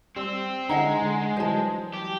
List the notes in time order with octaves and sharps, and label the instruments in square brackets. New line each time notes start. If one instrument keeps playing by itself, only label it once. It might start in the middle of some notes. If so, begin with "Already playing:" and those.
[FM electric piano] G3 E6 [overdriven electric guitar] C4
[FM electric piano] D3 D#4 E4 [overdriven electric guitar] G#3 [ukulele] D#5 F#5 A#5
[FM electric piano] D3
[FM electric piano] E3 F#3 G3 [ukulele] C5 A5
[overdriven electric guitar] G4